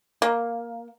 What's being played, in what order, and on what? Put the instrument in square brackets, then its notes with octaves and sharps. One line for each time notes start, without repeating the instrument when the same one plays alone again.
[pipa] A#3